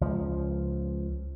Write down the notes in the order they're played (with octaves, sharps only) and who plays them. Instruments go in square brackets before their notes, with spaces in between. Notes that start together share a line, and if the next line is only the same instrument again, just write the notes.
[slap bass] C#2 F3